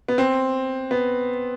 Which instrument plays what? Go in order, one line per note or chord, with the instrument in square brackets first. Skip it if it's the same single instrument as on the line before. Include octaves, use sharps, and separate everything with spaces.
[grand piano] B3
C4
B3